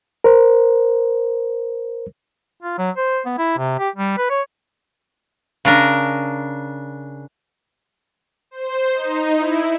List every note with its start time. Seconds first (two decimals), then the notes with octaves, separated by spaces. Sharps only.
0.24 A#4 C5
2.62 F4
2.78 F#3
2.97 C5
3.26 B3
3.38 E4
3.58 C3
3.79 G4
3.96 G3
4.17 B4
4.30 C#5
5.65 C#3 D4 A#4
8.51 C5
8.93 D#4
9.36 E4